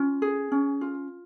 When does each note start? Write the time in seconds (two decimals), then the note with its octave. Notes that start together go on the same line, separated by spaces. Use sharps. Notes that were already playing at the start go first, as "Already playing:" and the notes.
Already playing: C#4 F4
0.22 G#4
0.52 C#4
0.81 F4